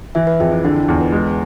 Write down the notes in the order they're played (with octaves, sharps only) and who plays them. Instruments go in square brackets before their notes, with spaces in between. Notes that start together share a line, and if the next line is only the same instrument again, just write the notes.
[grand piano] E3 [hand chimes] E5
[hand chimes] B4
[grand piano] F2 [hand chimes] G#4
[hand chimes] E4
[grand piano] D3 [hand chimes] D4
[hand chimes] E4
F4
[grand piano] E2 [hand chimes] G#4
[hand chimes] B4
[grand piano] G#3